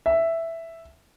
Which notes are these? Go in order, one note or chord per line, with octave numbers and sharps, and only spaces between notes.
E5